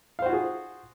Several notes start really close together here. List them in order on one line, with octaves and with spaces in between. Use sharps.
F5 C5 F#4 F4 G#4